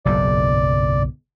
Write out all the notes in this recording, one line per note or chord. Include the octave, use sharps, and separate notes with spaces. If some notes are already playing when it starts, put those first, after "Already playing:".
F#1 B1 G#2 D5